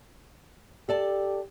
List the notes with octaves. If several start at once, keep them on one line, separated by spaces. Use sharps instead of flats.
G4 A4 D5 A5